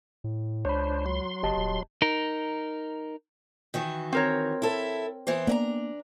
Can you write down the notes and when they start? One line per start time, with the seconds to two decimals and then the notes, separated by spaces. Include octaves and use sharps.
0.24 A2
0.65 C#2 D4 C5 C#5 B5
1.06 F#3 C6
1.43 F#1 G4 D#5 A5
1.56 D#1
2.02 D#4 A#4
3.74 D#3 E3 F#4
4.13 C4 A#4 C#5
4.62 E4 A4
5.27 E3 B3 C5
5.47 A#3 B3 D4 D#5 A#5